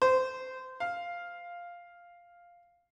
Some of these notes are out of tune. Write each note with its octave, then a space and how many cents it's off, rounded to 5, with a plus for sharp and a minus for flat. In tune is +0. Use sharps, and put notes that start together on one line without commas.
C5 -20
F5 +0